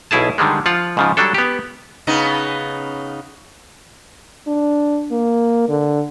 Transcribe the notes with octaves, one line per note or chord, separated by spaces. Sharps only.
B1 B2 E4 G#4 A5
D3 D#3 G3 G#3
F3 F4 F#5
G#2 C#3 F3
F#3 G3 D4 A4
B3 G4
C#3 B3 D#4
D4
A#3
D3